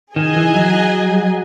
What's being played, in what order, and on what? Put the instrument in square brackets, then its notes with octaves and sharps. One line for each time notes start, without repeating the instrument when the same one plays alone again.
[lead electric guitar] D#3 [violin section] G#4 D#5 G#5
[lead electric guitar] E3
F#3